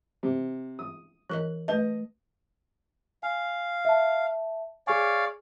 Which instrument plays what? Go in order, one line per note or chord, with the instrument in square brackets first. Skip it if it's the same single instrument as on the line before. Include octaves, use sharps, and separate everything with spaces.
[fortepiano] C3
D#6
[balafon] E3 A#4 D#5 [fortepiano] F#6
[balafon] A3 B4 A5 [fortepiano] D#5
[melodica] F5 [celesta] G#5
[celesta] E5 A5
[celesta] G#4 G#5 [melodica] C#5 D5 F5